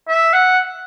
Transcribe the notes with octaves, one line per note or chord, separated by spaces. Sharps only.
E5
F#5